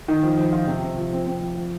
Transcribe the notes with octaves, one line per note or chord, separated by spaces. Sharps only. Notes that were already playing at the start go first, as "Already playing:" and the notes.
D#3
F3
F3
F4
C3
C4
F3
C4
C4
F3
F3